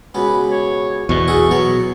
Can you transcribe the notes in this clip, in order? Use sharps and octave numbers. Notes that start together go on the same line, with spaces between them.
C#2 B2 C#4 B4
C#5
E2 B2 C#6
F#4 G#4 A4
B2 F#3 C#5